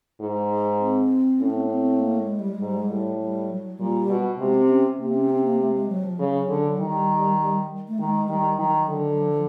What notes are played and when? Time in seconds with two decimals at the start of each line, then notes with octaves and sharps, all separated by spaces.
0.20 G#2
0.80 C4
1.40 A2 C#4
1.50 C4
1.60 B3
1.70 C4
2.00 A#3
2.19 G#3
2.39 G3
2.52 G#3
2.60 G#2 G3
2.77 G#3
2.89 A2 G3
3.19 G3
3.49 F#3
3.79 A#2 G3
4.09 B2
4.39 C3 G#3
4.54 C4
4.69 C#4
4.99 C3 A#3
5.14 C#4
5.29 C4
5.44 A#3
5.59 A3
5.74 G#3
5.89 F#3
6.04 F3
6.19 C#3 F#3
6.49 D3
6.78 D#3 G3
7.88 A3
7.98 D#3 G#3
8.28 D#3 G3
8.59 D#3 F#3
8.89 D3
9.18 F3
9.30 F3